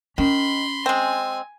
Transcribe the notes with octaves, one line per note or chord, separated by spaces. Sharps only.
D#3 C#4 B5 C6
G#3 C4 G#5